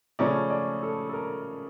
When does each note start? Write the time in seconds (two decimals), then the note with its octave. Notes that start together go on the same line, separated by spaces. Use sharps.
0.19 C#3 F3 A3 C#4 D5
0.50 D5
0.83 A4
1.09 A4
1.13 A#4